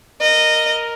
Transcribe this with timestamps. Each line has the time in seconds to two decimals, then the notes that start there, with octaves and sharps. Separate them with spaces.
0.21 A#4 D#5